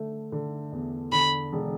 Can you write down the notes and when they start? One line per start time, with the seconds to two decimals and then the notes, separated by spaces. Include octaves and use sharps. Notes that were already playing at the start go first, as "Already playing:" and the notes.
Already playing: D3 A3
0.32 D3
0.72 E2
1.12 D3 B5
1.53 E1